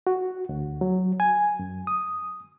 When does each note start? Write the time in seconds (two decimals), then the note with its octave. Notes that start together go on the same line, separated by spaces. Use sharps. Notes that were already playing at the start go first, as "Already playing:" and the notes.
0.07 F#4
0.49 D2
0.81 F#3
1.20 G#5
1.59 F#2
1.87 D#6